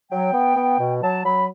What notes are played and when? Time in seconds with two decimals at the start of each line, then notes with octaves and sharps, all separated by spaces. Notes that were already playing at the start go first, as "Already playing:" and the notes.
0.11 F#3 G5
0.34 B3
0.56 B3
0.79 B2
1.03 F#3 A5
1.24 F#3 B5